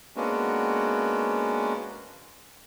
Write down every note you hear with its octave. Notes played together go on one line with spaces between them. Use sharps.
G#3 A#3 B3 C#4 D4 F#4